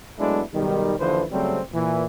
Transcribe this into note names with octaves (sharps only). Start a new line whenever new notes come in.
F#3 G#3 A3 B3 D4 E4
B1 D#3 G3
D#2 D3 E3 F3 B4 C5
C#3 F#3 G3 A3 C4
A#2 E3